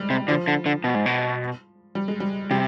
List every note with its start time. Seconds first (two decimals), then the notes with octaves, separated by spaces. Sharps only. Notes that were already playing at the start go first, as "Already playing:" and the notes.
Already playing: G3 G#3
0.10 C3
0.28 D3 F3
0.48 D3
0.66 D3
0.84 B2
0.95 G#2
1.06 B2
1.95 G3
2.08 G#3
2.20 G3
2.51 C3 G3